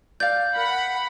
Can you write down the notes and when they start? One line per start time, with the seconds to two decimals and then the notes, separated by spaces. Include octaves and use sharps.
0.20 D5 F5 G6
0.56 A#4 F#5 B5